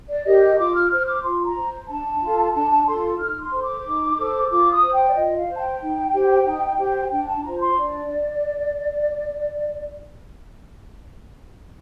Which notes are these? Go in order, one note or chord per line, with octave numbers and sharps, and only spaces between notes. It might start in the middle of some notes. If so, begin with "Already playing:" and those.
D5
G4 A#4 D#5
F4 D6
F6
C5 F6
D6
F4 C6
A#5
C5
D4 A5
F4 A4
D4 A5
A5
F4 A4 C6
D#4 F6
C6
A4 C5
D6
D#4
A4 C5
F4 D6
D#6
C5
G5
D5
F4 D#5
F5
C5
A5
G5
D#4
G4 C5
D#4
G4 C5
D4 G5
A5
F4 C5 A#5
C6
D4 D5